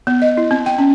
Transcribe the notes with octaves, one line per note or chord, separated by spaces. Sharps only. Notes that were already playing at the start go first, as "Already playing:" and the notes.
B3
D#5
E4
C4
G5
C#4